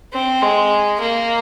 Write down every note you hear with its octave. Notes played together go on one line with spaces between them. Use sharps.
C4
G#3
A#3